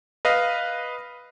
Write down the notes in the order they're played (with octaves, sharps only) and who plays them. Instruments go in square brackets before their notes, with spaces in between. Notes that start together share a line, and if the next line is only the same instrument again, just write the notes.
[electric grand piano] B4 D#5 F5